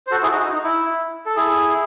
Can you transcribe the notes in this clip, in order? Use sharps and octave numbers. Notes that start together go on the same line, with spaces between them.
C5
F#4 A4
E4 G#4
D#4 F#4
D#4
D#4
E4
A4
E4 G#4